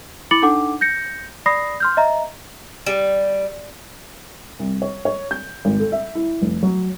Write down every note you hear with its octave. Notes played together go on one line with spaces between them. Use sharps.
E4 B5 D6 A6 C#7 F#7
D4 D#4 A4 F#5 D6
G6 A#6 C#7
D5 B5 D#6 A#6 C7
C6 F6 G6
D#5 E5 A#5
G3
C2
C#5
C#5
G6
G#1
A4
E5
E4
F1
F#3